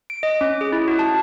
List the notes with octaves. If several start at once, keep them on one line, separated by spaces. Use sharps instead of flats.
D7
D#5
C#4
G#4
E4
F#4
A5